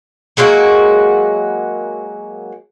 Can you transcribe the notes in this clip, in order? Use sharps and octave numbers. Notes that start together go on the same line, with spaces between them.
F#3 G#3 A#3 F#4